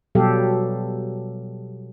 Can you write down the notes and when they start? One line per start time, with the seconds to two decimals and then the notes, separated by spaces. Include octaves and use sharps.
0.15 B2 F#3 G3 G4 A4 F5